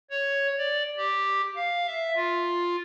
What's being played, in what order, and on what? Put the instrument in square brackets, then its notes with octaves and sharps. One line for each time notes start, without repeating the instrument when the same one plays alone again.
[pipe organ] C#5
D5
G4
F5
E5
F4